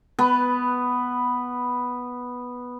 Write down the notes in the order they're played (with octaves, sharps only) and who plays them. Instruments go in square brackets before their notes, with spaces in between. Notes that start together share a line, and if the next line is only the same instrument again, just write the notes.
[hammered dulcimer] B3 B4